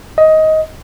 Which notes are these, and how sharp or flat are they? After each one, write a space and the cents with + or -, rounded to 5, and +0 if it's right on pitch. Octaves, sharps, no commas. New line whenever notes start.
D#5 +15